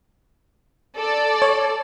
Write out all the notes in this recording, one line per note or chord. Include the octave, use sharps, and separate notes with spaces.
A4 D5
C#5